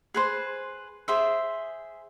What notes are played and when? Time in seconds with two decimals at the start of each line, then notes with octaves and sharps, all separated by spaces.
0.14 G#4 B4 C5
1.08 G#4 C5 E5